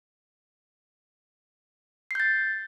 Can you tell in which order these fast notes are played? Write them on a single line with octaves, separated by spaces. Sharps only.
C7 G6 A6